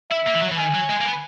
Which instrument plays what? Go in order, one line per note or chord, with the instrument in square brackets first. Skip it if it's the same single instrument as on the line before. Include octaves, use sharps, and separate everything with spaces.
[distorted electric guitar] E4 [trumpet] E5
[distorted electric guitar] A#3
E3
F#3
E3
[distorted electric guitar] D#3 [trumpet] G#5
[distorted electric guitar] F#3
G#3
A#3
B3